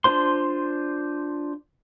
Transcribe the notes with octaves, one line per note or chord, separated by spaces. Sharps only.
D4 F4 C5 C6